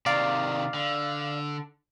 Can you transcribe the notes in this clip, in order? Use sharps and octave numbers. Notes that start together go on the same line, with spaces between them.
C3 D#3 D5 F5
D3